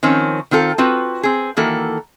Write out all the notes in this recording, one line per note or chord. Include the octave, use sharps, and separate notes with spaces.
D#3 F3 C4 C#4
D#3 C4 F4 A4
C4 F4 F#4 B4
C4 G#4
D#3 E3 A#3 F#4 A4